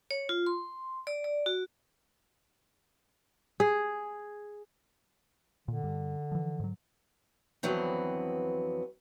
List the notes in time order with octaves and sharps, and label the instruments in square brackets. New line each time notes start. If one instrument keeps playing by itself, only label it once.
[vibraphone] C#5
F4
C6
D5
D5
F#4
[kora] G#4
[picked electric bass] A#2 [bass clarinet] D3
[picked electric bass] G2
E3 F3
G#2 F#3
[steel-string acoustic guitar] F2 D3 E3 F#3 B3 C4